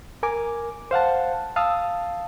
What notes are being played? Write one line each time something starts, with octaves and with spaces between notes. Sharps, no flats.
A#4 G#5 D6
C5 F5 F#5 A5
F5 A5 D#6 E6